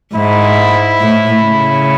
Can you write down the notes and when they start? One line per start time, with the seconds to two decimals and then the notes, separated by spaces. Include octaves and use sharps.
0.15 G#2 E4
1.00 A2
1.42 C#3